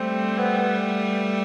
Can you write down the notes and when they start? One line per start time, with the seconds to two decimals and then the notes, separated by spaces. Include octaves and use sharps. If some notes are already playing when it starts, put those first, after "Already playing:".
Already playing: G3 A3 C4
0.38 B3
0.58 B3